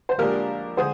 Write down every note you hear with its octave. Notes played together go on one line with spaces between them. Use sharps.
C5
A#1 A#2 G#3 D4 G4 A#4
D3 G#3 G#4 C5